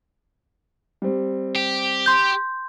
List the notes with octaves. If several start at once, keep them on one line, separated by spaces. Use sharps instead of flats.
G3 C4
G4
C6 G6